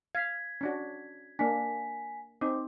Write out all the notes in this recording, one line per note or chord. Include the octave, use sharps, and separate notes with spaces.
F5 G#6 B6
C#4 D4 F#4
A#3 D4 G#5 B6
C4 D#4 D6